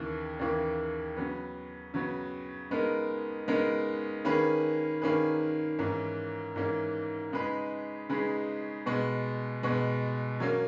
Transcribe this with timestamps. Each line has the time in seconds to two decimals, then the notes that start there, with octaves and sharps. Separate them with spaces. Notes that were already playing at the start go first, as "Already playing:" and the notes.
Already playing: D#2 C#3 E3 A#3
0.40 D#2 C#3 E3 A#3
1.17 C#3 F#3 B3
1.94 C#3 F#3 B3
2.70 C#3 G#3 B3 D#4 A#4
3.48 C#3 G#3 B3 D#4 A#4
4.25 D#3 A#3 C#4 G#4 B4
5.02 D#3 A#3 C#4 G#4 B4
5.79 G#2 E3 A#3 C#4
6.56 G#2 E3 A#3 C#4
7.32 C#3 G#3 D#4 G#4 B4
8.09 C#3 G#3 D#4 G#4 B4
8.86 B2 G#3 B3
9.63 B2 G#3 B3
10.40 F#3 A#3 C#4